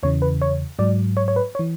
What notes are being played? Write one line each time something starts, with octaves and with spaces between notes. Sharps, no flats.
E2 C#3 E3 C#5
B4
C#5
G#2 F#3 D5
C#5
C#5
B4
C#5
E3